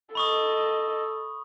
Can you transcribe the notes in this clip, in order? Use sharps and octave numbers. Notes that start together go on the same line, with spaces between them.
A4 D#5 B5 C#6 D#6